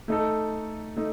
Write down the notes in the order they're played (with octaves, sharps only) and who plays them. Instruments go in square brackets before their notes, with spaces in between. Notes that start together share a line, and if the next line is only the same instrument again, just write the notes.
[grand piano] A3 D#4 A4
A3 D#4 A4